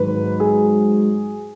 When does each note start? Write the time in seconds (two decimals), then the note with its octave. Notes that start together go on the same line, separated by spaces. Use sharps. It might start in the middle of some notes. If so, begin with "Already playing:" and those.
Already playing: G#2 D#3 F#3 B4
0.40 G#4